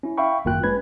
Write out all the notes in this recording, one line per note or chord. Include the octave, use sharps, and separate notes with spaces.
C#4 E4
E5 F5 G5 B5 C#6
G#1 F#2 A#3 F4 G5 F#6
G#3 C#4 B4 B5 G#6